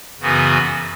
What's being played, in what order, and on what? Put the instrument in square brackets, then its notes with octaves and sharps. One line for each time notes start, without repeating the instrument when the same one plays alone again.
[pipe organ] F#2 C#3 E3 B3 F#4